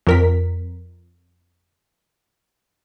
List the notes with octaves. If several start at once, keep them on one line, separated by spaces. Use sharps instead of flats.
F2 A#4 B6